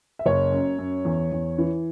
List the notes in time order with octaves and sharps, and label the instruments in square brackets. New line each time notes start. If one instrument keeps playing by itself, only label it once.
[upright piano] E5
F#1 C#5
F#2
F#2
E2
E2
E3